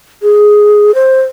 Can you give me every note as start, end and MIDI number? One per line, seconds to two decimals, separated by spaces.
0.22 0.94 68
0.95 1.21 72